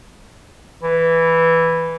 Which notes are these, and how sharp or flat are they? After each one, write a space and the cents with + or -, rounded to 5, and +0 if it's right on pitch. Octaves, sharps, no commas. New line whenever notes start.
E3 +0